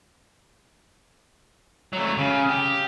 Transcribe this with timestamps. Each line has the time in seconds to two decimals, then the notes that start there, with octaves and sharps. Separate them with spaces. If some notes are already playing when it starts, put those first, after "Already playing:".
1.93 F#3 A3
2.17 C#3
2.49 G4